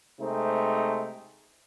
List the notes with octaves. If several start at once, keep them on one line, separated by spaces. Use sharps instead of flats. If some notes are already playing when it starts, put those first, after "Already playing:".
C3 G#3 A3 C4 D#4